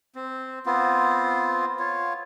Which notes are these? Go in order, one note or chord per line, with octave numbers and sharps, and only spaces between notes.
C4
B3 C4 F4
F4 C#5